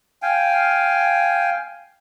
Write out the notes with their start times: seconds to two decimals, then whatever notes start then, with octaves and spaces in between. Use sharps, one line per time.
0.22 F5 G5 G#5